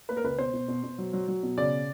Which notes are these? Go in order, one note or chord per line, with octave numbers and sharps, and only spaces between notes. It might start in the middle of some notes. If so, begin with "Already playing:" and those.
A#3 B4
A#4
C#2 B4
B2 C5
B2
B2
B2
F#3
F#3
F#3
B2
C#3 D5